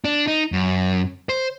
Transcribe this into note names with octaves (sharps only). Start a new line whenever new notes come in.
D4
D#4
F#2
C5